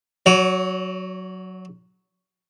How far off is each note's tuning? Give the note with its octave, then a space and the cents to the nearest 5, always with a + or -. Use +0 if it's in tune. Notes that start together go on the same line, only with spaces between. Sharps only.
F#3 +0 C#5 +45